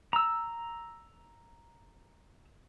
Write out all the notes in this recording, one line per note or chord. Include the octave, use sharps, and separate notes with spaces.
A#5 E6